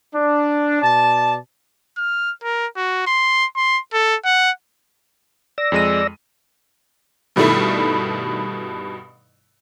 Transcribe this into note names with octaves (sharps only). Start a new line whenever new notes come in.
D4
B2 D5 A5
F6
A#4
F#4
C6
C6
A4
F#5
D5 E6 A#6
F2 G#3 D#7
G2 B2 D#3 G3 A3 E4